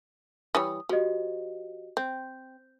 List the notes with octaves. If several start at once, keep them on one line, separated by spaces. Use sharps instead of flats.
E3 G3 C#5 D#6
F3 F#4 G4 D#5
C4 G6